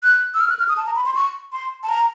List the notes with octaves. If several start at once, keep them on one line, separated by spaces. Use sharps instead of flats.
F#6
E6
F6
F#6
F6
D#6
A5
A#5
B5
C6
C#6
C6
A5
A#5